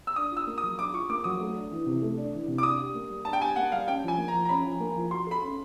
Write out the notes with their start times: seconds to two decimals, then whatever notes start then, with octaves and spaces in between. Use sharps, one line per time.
0.07 E6
0.16 D4 D#6
0.31 F4
0.37 E6
0.47 A#3
0.58 D#6
0.63 F#3
0.78 D4 D6
0.94 F4 C#6
1.09 A#3 D6
1.24 F#3 D#6
1.41 A3
1.55 D4
1.71 E3
1.86 C3
2.02 A3
2.17 D4
2.33 E3
2.48 C3
2.58 D6
2.63 D4 D#6
2.79 G4
2.95 A#3
3.10 G3
3.25 D4 A5
3.33 G5
3.41 G4 G#5
3.56 A#3 F#5
3.72 G3 F5
3.87 C#4 G5
4.03 F3 G#5
4.18 A#3
4.28 A#5
4.33 F3
4.45 A#5
4.49 C#4 B5
4.64 F3
4.80 A#3
4.96 F3
5.11 F#4 C6
5.27 A4 B5
5.43 C#4